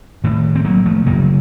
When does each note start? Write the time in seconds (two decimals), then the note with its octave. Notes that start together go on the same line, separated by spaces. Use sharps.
0.24 A2 D#3
0.55 C4
0.65 F#3 A#3
0.86 F3 A3
1.06 F#2 C#3 F#3 A#3